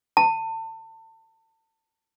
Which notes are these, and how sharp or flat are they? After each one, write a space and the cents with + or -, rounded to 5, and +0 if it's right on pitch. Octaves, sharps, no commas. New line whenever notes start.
A5 +30